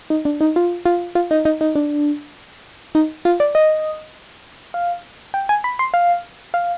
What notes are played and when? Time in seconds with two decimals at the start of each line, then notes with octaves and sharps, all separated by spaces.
0.10 D#4
0.25 D4
0.41 D#4
0.56 F4
0.86 F4
1.15 F4
1.31 D#4
1.45 D#4
1.61 D#4
1.76 D4
2.95 D#4
3.25 F4
3.40 D5
3.55 D#5
4.74 F5
5.34 G5
5.49 G#5
5.64 B5
5.79 C6
5.94 F5
6.54 F5